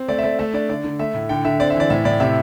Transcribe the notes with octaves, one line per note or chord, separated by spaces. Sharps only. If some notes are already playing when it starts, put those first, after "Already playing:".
Already playing: C4
A3 D5
E5
A3 D5
A3 E5
D4 D5
D3 D5
D3
A3 E5
A2
D3 G5
D3 E5
C4 D5
E5
E3
D5
A2 E5
A2 D5
C3 E5